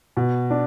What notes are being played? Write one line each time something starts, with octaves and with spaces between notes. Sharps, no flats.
B2
D4